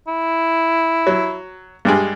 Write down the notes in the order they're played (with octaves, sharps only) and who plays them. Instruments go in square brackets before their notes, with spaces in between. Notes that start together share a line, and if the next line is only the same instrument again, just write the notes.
[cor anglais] E4
[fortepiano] F#3
G2 G3 G#3